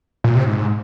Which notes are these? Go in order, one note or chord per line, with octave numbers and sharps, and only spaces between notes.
A#2
C3
G#2